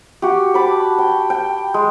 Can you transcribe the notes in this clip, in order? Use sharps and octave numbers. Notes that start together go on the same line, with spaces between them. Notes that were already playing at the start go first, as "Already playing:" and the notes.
F#4 G4
A5 B5 D6
G5
G5
G#3